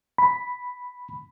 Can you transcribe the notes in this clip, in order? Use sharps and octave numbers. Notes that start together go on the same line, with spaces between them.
B5